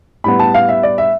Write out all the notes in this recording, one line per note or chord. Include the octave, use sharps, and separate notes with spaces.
A2 G3 B3 B5
A5
F5
E5
D5
E5